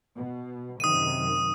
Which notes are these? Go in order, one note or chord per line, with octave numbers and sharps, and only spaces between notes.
B2
F#2 C3 D#3 D#6 D#7